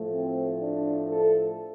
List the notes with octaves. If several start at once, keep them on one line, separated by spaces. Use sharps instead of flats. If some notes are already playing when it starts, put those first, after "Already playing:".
Already playing: A2 F3 A3
C4
D4
A4